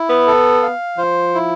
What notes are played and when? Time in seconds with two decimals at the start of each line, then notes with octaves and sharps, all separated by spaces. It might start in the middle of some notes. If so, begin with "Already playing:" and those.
Already playing: E4
0.09 B3
0.27 A4
0.62 F5
0.98 F3 C5
1.35 E4